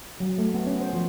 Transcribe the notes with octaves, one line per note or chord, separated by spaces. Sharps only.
F#3
A3
B3
C#4
C5
F3